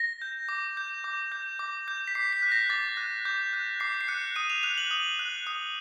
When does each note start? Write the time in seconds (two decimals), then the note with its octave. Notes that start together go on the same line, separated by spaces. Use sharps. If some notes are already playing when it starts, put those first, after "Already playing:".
Already playing: A#6
0.22 G6
0.49 D6
0.77 G6
1.04 D6
1.32 G6
1.59 D6
1.88 G6
2.08 B6
2.15 D6 C7
2.33 B6
2.42 F#6
2.52 A#6
2.70 D6 A6
2.97 F#6
3.25 D6 G6
3.53 F#6
3.80 D6 C7
4.01 C7
4.08 F#6 C#7
4.36 D#6 D#7
4.50 F7
4.63 F#6 F7
4.78 F#7
4.91 D#6
5.19 F#6
5.47 D#6